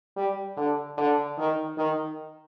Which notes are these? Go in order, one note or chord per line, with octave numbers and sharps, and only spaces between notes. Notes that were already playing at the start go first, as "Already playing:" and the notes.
G3
D3
D3
D#3
D#3